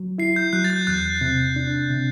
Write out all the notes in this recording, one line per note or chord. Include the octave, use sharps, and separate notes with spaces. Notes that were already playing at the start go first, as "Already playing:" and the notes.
Already playing: F#3
E4 C7
G6
F#3 F#6
A6
G6
E2 F#6
C3
D4
C3